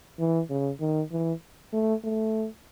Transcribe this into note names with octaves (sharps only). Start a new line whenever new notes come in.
E3
C#3
D#3
E3
A3
A3